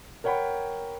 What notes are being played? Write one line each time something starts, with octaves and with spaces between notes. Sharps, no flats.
A#4 C#5 F#5 G5 B5